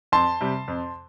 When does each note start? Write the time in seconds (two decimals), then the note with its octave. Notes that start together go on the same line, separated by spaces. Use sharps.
0.12 F2 A5 C6
0.41 C3 G3
0.68 F2